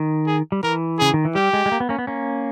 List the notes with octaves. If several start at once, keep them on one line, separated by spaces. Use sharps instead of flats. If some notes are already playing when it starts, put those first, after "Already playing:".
Already playing: D#3
G#4
G3
E3 A#4
C#3 G#4
D#3
E3
G3 G4
G#3
G#3
A#3
B3
A#3 C#4
B3
A#3 C#4